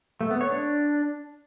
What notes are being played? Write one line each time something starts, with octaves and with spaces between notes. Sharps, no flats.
A3
B3
C#5
D4